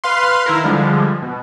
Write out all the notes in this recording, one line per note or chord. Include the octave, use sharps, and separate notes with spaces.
B4 F5 C6
D#3 E4 A#4
D3 F3 G3 G#3
B2